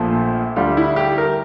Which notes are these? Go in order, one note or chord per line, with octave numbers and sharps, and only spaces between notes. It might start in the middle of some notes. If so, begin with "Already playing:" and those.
Already playing: A#1 A#2 F3 A3
D2 D3 G3 F4
E4
G4
A#4